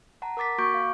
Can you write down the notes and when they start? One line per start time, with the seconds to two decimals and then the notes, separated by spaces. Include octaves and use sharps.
0.22 F#5 A5 A#5
0.37 A#4 F#5 D6 A6 B6
0.58 A#3 F#4 C#6 D6 G6 D7
0.74 F5